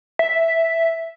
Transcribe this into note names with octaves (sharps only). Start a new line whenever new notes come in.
E5